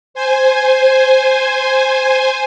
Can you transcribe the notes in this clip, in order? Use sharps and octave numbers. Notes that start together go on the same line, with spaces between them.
C5 G#5